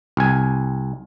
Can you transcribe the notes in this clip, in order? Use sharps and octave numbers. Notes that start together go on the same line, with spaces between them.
C2 G#5